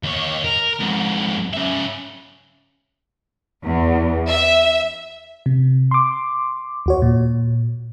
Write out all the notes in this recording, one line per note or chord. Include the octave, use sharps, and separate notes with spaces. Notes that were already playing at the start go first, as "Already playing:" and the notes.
D#2 C#5
A#4
F2 G#2
C#3 E5
E2
E5
C3
C6 D6
D#2 F#4 C#5
A#2